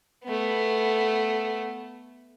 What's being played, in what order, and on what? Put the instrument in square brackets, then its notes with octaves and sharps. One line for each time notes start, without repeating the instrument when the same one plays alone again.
[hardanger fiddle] A3 B3